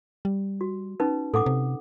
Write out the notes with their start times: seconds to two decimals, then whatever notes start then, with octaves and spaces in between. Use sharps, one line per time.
0.25 G3
0.61 F#4
1.00 C#4 D#4 B4
1.34 A2 A4 F#5 D6
1.46 C3